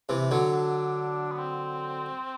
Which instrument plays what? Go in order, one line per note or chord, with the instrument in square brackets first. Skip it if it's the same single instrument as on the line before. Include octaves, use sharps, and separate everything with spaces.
[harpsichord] C3 E3
D3 F#3
[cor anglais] D4
B3
C4